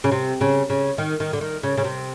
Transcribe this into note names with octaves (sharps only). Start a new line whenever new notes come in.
C#3
C3
C#3
C#3
D#3
D#3
D3
D#3
C#3
C#3
C3